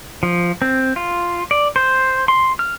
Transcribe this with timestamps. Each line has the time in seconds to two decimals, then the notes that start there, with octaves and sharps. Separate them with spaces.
0.23 F3
0.62 C4
0.96 F4
1.51 D5
1.76 C5
2.28 C6
2.59 F6